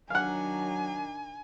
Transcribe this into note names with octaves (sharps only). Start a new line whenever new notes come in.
D#3 F#3 D4 F5 F#5 G#5